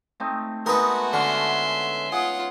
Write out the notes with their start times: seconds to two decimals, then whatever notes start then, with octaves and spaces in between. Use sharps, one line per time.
0.20 A3 C4 D#4
0.66 G#3 A3 B3 D#4 F#4 A#4 B4
1.13 D3 C#4 E5 C6
2.12 F4 G#4 F#5